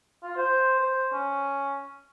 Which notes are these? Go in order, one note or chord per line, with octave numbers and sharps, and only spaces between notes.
F4
C5
C5
C#4